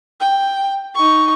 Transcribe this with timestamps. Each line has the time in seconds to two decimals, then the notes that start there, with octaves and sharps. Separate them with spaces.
0.20 G5
0.96 D#4 C#6